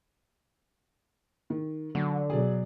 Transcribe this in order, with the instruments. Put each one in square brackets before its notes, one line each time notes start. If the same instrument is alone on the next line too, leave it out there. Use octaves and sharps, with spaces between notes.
[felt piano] D#3
[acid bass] D3 [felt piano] F#3
[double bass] B2 F#3 [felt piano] G#4 D5